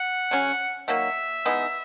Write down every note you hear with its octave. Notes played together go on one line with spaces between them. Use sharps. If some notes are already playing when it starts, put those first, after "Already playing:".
Already playing: F#5
C#3 F#3 C#4
D#3 F#3 A#3 E5
E3 G#3 B3 D#4